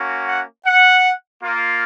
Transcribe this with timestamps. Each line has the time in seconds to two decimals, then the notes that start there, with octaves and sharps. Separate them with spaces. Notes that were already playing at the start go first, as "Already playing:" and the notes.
Already playing: A#3 C#4 F#4
0.27 F#5
0.66 F#5
1.42 A#3 F4